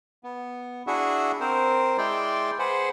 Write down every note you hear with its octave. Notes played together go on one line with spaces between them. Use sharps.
B3
D4 E4 F#4 G#4 E5 F#5
C4 A#4 C5
G#3 E4 D5 G5 C6
G#4 B4 C5 F#5